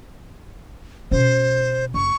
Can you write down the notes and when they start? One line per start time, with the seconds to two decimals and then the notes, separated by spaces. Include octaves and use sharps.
1.11 B2 C#4 C5
1.94 F#1 C#6